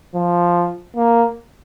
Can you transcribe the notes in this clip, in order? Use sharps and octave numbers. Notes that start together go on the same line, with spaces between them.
F3
A#3